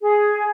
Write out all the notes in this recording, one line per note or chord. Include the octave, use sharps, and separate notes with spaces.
G#4